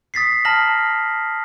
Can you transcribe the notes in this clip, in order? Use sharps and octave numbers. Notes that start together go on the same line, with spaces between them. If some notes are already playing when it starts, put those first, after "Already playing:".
D#6 A6 B6 C7
A5 A#5 F6 A#6 F#7